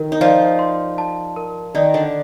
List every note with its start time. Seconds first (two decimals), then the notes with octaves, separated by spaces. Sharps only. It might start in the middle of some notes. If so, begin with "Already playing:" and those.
Already playing: D#3 A#4
0.12 D#4
0.21 F3 F4 D5
0.59 C6
0.98 A5
1.36 A#4
1.75 D#3 D#4 D5
1.94 D3 D4